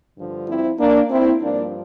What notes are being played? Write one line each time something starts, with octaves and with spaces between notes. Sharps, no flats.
G2 D3 F3
C4 E4
A#3 D4
C4 E4
G2 F3 A#3 D4